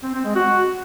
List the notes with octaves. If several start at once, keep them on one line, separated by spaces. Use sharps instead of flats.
C4
C4
G#3
F#4